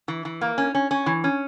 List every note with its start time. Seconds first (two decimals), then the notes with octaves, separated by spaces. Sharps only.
0.08 E3
0.25 E3
0.41 A#3
0.58 C#4
0.75 C#4
0.91 C#4
1.06 E3
1.24 C#4